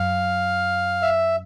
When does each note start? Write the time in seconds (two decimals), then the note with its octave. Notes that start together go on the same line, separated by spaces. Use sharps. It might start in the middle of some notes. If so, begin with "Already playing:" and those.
Already playing: F#2 F5
1.02 E5